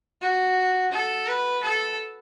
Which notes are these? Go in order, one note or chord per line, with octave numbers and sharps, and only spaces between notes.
F#4
A4
B4
A4